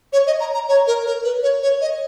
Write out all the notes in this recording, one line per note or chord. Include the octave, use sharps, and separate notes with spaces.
C#5
D#5
A#5
A#5
C#5
A#4
A#4
B4
C#5
C#5
D#5